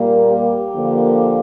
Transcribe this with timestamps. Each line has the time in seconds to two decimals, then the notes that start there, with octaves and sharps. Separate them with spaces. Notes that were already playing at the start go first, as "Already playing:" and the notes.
Already playing: A#2 G3 A#3
0.27 G4
0.75 D3 F3 A#3